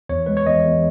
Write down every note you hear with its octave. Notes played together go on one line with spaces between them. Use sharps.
E2 C#5
G#3 B4
C#5
E2 D#5
E2